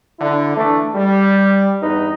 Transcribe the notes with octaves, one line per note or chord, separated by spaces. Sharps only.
D3 E4
E3 A3 D4
G3
E2 G2 D#4 B4